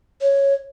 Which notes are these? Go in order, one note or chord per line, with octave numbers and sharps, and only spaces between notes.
C#5